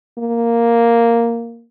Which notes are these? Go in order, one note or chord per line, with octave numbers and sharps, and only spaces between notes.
A#3